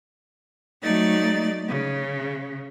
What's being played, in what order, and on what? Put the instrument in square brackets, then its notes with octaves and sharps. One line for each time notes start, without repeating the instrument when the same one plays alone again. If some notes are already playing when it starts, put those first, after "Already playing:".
[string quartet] F#3 A3 D#4 D5 A6
C#3